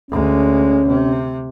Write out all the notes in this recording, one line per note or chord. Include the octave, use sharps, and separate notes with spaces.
D2 G#3 C#4
C3